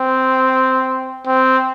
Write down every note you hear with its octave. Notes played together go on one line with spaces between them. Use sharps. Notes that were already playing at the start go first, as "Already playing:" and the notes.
Already playing: C4
C4